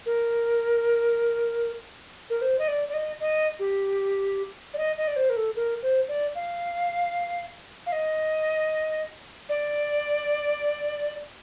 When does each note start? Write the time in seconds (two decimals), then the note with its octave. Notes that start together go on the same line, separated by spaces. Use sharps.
0.06 A#4
2.30 A#4
2.41 C5
2.59 D#5
2.68 D5
2.88 D5
2.94 D#5
3.20 D#5
3.59 G4
4.74 D5
4.78 D#5
4.97 D#5
5.08 D5
5.16 C5
5.30 A#4
5.37 A4
5.56 A#4
5.82 C5
6.08 D5
6.35 F5
7.86 F5
7.92 D#5
9.49 D5